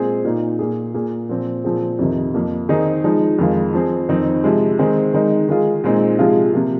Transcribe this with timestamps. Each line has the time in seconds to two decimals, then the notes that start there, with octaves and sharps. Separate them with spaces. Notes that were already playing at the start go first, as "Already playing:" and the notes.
Already playing: A#2 G#3 C4 G#4
0.24 A#2 A#3 D#4
0.59 A#2 A#3 G#4
0.94 A#2 A#3 G#4
1.29 A#2 F3 C4
1.64 A#2 F3 C4 G#4
1.99 F2 C3 D#3
2.34 F2 F3 A#3
2.69 D#3 C4 D#4 G#4
3.04 F3 G#3 D#4
3.39 F2 D#3 G#3 F4
3.74 F3 C4 G#4
4.09 F2 D#3 C4 D#4
4.44 C3 F3 G#3
4.79 D#3 G#3 C4 G#4
5.14 D#3 G#3 D#4
5.48 D#3 G#3 F4 G#4
5.84 A#2 G#3 C4 D#4
6.19 C3 F3 G#3 F4 G#4
6.54 C3 F3 A#3